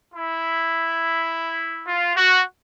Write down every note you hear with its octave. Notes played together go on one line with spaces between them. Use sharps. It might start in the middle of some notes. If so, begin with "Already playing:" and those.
E4
F4
F#4